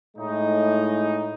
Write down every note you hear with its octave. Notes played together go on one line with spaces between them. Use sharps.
A2 G#3 D#4